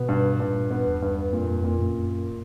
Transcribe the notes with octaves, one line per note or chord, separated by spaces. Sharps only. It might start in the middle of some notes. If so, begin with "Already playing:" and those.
Already playing: B2 B3
G2
G2 A#2
B3
E2
G2
F2 A#2
A#2
F#2